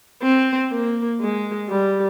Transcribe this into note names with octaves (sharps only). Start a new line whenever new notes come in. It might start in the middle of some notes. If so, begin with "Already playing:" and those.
C4
A#3
G#3
G3